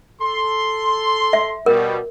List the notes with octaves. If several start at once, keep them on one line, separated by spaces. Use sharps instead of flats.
A4 C6
E5
B2 G3 A#4